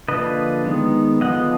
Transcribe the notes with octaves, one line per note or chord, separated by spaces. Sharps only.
D3 F3 A#3 D4 B4 D#5
D#3 G#3 B3
D3 F3 B3 D#5 F#5